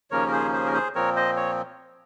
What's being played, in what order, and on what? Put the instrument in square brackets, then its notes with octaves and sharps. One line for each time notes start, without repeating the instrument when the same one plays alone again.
[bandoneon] D#2 C#3 F3 A#3 C#4 A#4 C#5
A#4
G#4 C5
G#4 C5
A#4
G#4 C5
A#2 F3 C4 A#4 C#5
C5 D#5
C#5